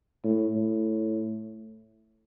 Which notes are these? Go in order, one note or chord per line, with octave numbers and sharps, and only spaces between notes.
A2
A2